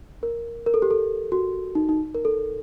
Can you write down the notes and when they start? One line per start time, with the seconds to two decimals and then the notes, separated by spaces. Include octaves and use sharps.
0.23 A#4
0.66 A#4
0.74 A4
0.82 G4
0.91 A4
1.32 F#4
1.75 D#4
1.89 D#4
2.15 A#4
2.25 A4